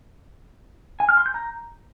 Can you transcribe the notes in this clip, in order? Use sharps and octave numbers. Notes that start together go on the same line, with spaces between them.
G#5
F6
C6
G6
A#5